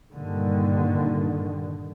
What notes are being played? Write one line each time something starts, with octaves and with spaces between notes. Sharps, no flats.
G2 A#2 D3 D#3